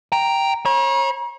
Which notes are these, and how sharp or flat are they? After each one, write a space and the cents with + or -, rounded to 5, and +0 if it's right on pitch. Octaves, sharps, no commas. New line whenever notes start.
G5 +0 A#5 +0
C#5 -35 A#5 +45